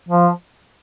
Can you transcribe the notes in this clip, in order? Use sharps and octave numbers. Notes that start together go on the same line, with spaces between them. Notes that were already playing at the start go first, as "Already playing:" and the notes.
F3